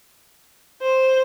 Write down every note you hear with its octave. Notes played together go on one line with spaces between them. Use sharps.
C5